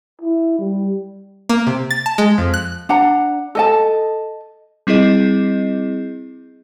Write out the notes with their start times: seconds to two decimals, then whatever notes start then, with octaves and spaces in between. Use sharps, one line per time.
0.21 E4
0.58 G3
1.49 A#3
1.67 C3
1.91 A6
2.06 A5
2.18 G#3
2.38 F2
2.54 F#6
2.89 D4 F#5 A#5
3.55 A4 D#5 A5
4.87 G3 C4 E4 G#4 D#5